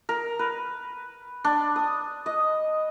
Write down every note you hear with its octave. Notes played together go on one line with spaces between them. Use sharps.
A#4
B4
D4
D#6
D#5